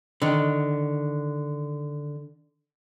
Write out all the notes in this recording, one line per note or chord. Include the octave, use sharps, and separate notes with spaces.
D3 D#3